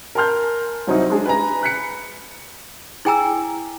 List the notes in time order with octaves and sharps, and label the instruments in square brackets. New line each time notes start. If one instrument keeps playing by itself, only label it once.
[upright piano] A#4 G#5 A5 C6 F6 G6
C2 F#3 C4 D#4 E4
G#3 D4 G#4
B4 G#5 A#5
B5 F#6 B6 C#7
[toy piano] E4 G#4 G5 G#5 A#5 E6